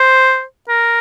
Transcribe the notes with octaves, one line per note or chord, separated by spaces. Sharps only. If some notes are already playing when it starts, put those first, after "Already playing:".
Already playing: C5
A#4